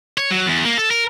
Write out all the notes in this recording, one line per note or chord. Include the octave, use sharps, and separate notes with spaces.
C#5
F#3
E2
A#3
A4
A#4